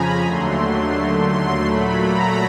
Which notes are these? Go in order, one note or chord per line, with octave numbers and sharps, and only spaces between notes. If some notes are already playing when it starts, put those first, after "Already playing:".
Already playing: F2 C#3 F3 G#5 A#5 B5
D#2 D3 F#3 A3 C6
C6
A#2 F#3 A3 B5
A#5